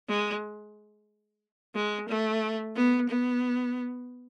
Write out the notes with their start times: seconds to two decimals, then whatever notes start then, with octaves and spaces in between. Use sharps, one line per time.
0.09 G#3
1.75 G#3
2.09 A3
2.76 B3
3.09 B3